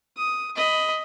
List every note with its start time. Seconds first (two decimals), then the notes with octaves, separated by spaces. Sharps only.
0.17 D#6
0.56 D#5 B5